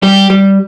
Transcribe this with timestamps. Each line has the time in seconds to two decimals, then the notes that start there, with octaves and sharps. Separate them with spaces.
0.03 G3 G4
0.30 G3